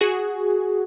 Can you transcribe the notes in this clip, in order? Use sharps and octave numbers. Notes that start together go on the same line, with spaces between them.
F#4 G#4